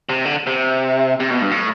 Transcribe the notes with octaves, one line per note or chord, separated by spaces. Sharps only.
C3
D3
C3
C3
B2
G2
A2